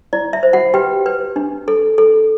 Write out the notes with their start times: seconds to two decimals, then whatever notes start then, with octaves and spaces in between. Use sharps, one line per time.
0.13 E4 D5
0.33 E5
0.43 C5
0.53 F#4 F#5
0.74 G4 B4 G5
1.06 B4
1.36 D4
1.68 A4
1.98 A4